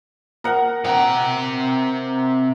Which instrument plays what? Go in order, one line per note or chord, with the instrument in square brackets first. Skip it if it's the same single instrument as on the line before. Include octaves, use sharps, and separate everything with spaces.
[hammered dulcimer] A#4 F#5
[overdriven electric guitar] C3 G5 [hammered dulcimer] F#5 A#5